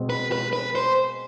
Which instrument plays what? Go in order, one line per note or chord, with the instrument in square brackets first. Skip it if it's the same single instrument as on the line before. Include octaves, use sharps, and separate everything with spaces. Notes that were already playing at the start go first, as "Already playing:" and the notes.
Already playing: [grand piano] B2 G#3 C4
[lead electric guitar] B4
B4
B4
C5